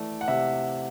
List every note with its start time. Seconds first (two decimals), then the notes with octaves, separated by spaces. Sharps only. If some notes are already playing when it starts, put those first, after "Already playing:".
Already playing: E3 A3 D5
0.21 F#5
0.28 C3 E5